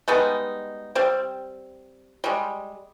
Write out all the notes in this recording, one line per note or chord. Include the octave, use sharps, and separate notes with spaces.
G3 G#3 B3 D#4
G3 C4
G3 G#3